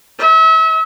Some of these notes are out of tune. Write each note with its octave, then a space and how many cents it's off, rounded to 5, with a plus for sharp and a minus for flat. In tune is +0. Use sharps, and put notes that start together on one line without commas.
E5 -35